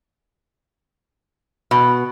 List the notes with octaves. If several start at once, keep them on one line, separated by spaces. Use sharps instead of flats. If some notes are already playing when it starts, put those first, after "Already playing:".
B2